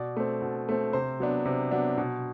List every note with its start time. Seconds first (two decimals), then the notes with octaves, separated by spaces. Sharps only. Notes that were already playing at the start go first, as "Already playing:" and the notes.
Already playing: B2 D5
0.17 A3 C4
0.42 B2
0.69 A3 C4
0.93 C3 C5
1.20 F#3 B3 D4
1.45 C3
1.71 F#3 B3 D4
1.98 B2